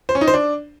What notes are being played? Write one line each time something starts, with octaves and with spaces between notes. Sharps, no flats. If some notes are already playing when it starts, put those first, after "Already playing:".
C5
C#4
D#4
C5
D4